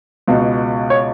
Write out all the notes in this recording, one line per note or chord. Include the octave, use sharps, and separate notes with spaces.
C#2 B2
C#5